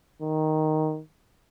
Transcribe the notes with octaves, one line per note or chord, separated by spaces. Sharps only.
D#3